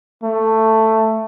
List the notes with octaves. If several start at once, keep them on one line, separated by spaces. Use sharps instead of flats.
A3